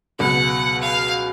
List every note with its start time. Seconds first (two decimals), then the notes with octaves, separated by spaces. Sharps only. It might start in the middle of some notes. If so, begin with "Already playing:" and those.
0.19 C#2 B2 F#3 F#5
0.82 F5